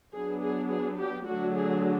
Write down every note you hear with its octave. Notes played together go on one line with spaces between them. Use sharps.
F#3 B3 D4 G#4
G#4
G#4
G4
D3 F#3 A3 D4 F#4
G#4